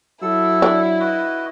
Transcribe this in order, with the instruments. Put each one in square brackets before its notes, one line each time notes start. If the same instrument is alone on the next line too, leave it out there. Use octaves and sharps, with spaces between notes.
[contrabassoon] F#3 [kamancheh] E4 [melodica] A4 E6
[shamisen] D4
[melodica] F#4 B4 D#5